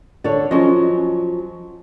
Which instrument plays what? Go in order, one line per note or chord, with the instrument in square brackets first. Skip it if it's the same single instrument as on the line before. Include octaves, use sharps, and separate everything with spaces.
[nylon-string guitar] D3 A4 C#5 [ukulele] D5
[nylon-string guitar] F3 F#3 [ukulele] C#4 G#4 D#5